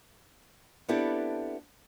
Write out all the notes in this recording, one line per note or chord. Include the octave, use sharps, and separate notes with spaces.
B3 C4 D4 E4 G4 A4